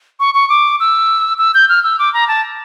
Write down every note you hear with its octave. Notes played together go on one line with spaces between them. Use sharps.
C#6
C#6
D6
E6
E6
G6
F6
E6
D6
A#5
A5